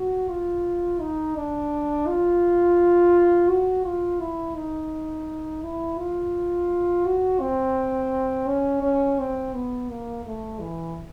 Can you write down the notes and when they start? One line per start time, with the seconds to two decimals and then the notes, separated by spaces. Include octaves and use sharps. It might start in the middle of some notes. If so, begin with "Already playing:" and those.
Already playing: F#4
0.29 F4
1.00 D#4
1.36 D4
2.07 F4
3.49 F#4
3.85 F4
4.20 E4
4.55 D#4
5.63 E4
5.98 F4
7.05 F#4
7.40 C4
8.47 C#4
8.82 C#4
9.19 C4
9.54 B3
9.90 A#3
10.25 A3
10.60 E3